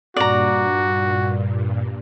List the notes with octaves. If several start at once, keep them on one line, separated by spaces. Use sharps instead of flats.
G2 A#2 F#4 D5 A#5